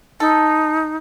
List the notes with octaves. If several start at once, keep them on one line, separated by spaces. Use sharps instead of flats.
D#4 A4